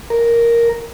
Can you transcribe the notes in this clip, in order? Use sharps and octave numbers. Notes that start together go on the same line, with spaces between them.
A#4